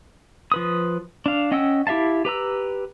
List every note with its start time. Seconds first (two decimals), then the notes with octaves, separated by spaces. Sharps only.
0.52 F3 B4 D#6
1.26 D4 F5
1.52 C#4 D#5 F#5 G5 E6
1.87 E4 G4 E5 F5 A5
2.25 G4 B4 A#5 E6